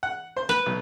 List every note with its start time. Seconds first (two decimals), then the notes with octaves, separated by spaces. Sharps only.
0.03 F#5
0.36 C5 C6
0.49 B4
0.66 B1